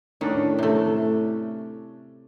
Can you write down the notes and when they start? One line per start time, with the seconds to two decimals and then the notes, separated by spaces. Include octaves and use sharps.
0.21 A2 D#3 C#4 D4
0.59 C3 A3